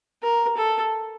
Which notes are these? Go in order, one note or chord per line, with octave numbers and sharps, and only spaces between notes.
A#4
A4